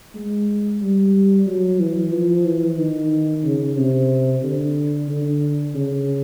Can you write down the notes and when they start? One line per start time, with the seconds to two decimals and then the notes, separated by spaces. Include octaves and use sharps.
0.14 G#3
0.81 G3
1.46 F#3
1.80 E3
2.12 F3
2.45 E3
2.78 D#3
3.44 C#3
3.77 C3
4.43 D3
5.09 D3
5.74 C#3